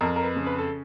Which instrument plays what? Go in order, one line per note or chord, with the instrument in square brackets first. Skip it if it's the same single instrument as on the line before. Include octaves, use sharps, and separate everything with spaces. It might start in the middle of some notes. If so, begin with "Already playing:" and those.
[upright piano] F2 A#4
A#4
B4
C#3
B4
A4